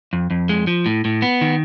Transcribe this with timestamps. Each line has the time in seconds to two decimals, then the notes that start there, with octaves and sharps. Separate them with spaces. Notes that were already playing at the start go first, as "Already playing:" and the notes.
0.13 F2
0.31 F2
0.49 G#3
0.67 F3
0.86 A2
1.05 A2
1.22 B3
1.41 D#3